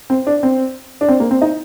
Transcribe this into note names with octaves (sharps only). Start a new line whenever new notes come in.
C4
D4
C4
D4
C4
A#3
C4
D#4